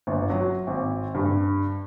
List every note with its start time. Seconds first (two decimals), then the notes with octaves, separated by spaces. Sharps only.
0.07 G1
0.30 F#3
0.67 G#1
1.15 G2